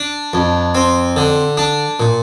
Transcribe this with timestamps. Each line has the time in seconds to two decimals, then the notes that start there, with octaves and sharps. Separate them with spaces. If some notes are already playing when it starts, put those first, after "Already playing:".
Already playing: D4
0.33 F2
0.75 C4
1.16 D3
1.57 D4
2.00 A#2